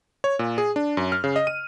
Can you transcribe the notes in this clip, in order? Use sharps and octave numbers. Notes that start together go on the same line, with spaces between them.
C#5
A#2
G#4
D4
F#2
F6
C#3
D#5
D#7